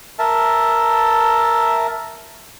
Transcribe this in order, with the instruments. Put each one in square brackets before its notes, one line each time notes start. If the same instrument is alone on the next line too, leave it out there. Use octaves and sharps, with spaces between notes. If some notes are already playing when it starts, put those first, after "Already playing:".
[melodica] A#4 E5 A5